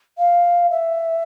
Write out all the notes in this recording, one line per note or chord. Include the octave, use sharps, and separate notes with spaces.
F5
E5